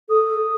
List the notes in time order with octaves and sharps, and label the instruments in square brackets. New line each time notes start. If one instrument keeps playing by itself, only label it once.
[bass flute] A4 [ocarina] D#6